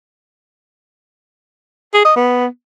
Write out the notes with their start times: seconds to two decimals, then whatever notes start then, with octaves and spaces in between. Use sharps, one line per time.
1.94 G#4
2.05 D#5
2.16 B3